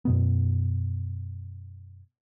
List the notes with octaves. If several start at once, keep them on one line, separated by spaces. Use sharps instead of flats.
F#2 B2 B3